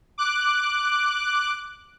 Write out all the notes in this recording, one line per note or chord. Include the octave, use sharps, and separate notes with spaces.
D6 F#6